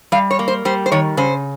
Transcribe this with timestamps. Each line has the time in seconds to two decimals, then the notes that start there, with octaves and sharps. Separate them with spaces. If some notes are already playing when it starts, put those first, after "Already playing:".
0.12 G3 F5
0.31 C#5
0.39 A#3
0.48 C5
0.65 G3 C5
0.86 C5
0.92 D#3 C#5
1.17 C#3 C5